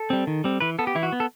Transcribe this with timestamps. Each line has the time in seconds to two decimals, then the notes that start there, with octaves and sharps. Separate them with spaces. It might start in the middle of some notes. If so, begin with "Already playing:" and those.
Already playing: A4
0.10 G3 C4
0.27 D#3
0.44 G3 C4
0.61 E3 B4
0.79 B3 A4
0.87 G4
0.95 E3 E4
1.03 F#4
1.12 B3
1.20 A4